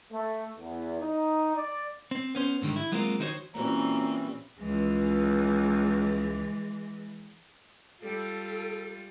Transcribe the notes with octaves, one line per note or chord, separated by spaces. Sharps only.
A3
E2
D#4
D5
C4
B3 C#4 C5
G#2 D3 D#3 G3
E4
F#3 G#3 A#3 C4 F4 A#4
D#3 D#4 E4 F#4 C5 C#5
A#2 E3 G3 C4 C#4 F#4 A#5
C#2 E3 G#3
G3 F4 A4